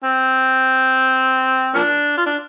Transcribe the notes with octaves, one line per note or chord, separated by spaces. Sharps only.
C4
F3 A#3 D4
F4
D4